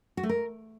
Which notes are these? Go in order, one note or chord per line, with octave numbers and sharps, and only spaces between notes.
F#4
A3
A#4